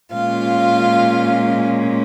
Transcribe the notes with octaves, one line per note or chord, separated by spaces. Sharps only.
A#2 G#3 C#4 F4 F5